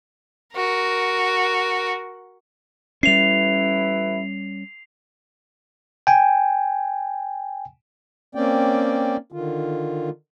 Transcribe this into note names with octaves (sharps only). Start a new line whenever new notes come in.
F#4 A#4
A1 G3 C#4 E4 B4 C7 F7
G5 G#5
A#3 C4 C#4 D5 G5
D3 D#3 F4